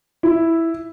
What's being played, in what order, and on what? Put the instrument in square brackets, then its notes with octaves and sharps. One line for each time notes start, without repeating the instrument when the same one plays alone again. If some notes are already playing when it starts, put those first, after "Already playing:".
[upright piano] E4